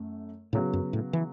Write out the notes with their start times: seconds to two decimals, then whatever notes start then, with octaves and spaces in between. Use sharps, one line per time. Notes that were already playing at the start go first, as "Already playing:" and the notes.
Already playing: F#2 A3
0.53 A2 C#3 F#3 B3
0.73 F#2
0.93 A2
1.13 E3